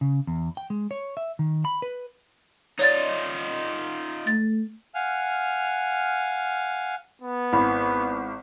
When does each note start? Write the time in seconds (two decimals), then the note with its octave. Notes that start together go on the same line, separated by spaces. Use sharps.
0.01 C#3
0.27 E2
0.57 G5
0.70 G#3
0.91 C#5
1.17 E5
1.39 D#3
1.65 B5
1.82 B4
2.79 D#4 F4 C#5 D5 A6
4.27 A3 A6
4.95 F5 F#5 G#5 F6
7.21 B3
7.53 G#1 E4 B5